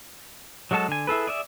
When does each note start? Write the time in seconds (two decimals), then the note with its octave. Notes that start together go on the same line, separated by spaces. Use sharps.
0.71 F#3 G#3 F#4 A4 A5
0.88 D3 G#5
1.07 E4 G#4 A4 B4
1.27 G#4 D5 E5